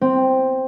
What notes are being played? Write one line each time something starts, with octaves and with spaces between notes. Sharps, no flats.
C4